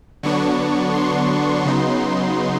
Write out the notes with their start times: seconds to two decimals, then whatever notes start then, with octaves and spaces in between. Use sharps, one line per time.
0.23 D3 F#3 B3 D4 C#6
0.94 C6
1.65 C#3 F#3 B3 D#4